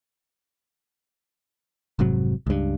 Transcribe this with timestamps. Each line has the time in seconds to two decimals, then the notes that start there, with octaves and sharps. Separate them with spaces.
1.99 F1 G#2 C3 F#3
2.47 C#2 G2